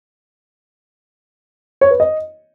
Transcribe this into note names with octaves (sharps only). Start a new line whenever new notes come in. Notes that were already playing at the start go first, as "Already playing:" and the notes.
C#5
B4
D#5